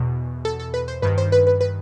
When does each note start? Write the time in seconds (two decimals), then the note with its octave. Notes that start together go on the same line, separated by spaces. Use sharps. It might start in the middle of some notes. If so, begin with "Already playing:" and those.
Already playing: E2 B2
0.45 A4
0.60 A4
0.74 B4
0.88 C5
1.02 G2 D#3 B4
1.18 C5
1.32 B4
1.47 B4
1.61 B4